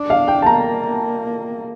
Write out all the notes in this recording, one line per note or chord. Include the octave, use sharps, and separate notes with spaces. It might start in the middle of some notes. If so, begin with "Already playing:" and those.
Already playing: D4
F5
G5
A5
A#3 A#5